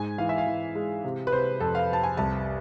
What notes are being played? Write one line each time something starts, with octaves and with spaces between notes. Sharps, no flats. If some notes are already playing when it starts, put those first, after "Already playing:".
Already playing: G#2 G#5
E3 F5
E5
F5
E3
G#3
C3
B4
C3 C5
F2 A4
F5
C3 A5
G#5
C2 A5